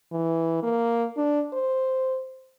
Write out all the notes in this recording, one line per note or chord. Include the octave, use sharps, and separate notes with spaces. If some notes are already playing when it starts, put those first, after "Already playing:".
E3
A#3
D4
C5